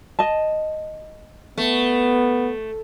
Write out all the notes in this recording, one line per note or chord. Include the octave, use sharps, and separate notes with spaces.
D#5 A5
A3 B3